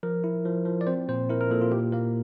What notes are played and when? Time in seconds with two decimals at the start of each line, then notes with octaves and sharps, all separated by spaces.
0.03 F3 A#4
0.24 E4
0.46 F3
0.65 F3
0.81 D5
0.87 C4 C5
1.08 A#2 C5
1.30 E4 A#4
1.41 A#4
1.50 A#2 A4
1.61 F4
1.71 A#3 G4
1.93 A#3 A#4